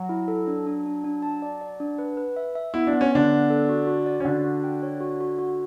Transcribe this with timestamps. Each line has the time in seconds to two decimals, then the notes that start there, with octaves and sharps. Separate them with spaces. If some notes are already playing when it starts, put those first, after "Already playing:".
Already playing: F#3 F#4
0.09 E4
0.28 A4
0.47 D4
0.67 D4
0.86 D4
1.04 D4
1.22 A5
1.42 D5
1.61 D5
1.80 D4
1.98 B4
2.17 B4
2.36 E5
2.55 E5
2.74 B3 E4
2.87 D4
2.93 B3
3.01 C#4
3.12 D3 B3 D4
3.31 B3
3.50 A4
3.69 F#4
3.87 F#4
4.06 D5
4.20 C#4
4.25 D3 D4 F#4
4.44 F#4
4.64 G5
4.83 C#5
5.00 F#4
5.20 F#4
5.39 F#4